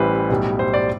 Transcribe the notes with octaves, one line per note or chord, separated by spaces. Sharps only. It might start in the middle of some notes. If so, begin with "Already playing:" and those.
Already playing: A1 A2 E3 G3 B4 C5
B1 A2 G3
C5
D5